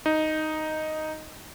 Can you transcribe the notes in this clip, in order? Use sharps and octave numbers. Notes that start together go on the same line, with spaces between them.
D#4